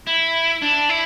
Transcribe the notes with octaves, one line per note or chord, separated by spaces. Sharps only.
E4
D4
E4